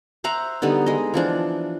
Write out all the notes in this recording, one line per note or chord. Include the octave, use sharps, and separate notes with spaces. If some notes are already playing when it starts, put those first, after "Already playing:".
C5 E5 F#5 A#5
D3 G3 B3 D#4
G#3 D#5
E3 F3 D4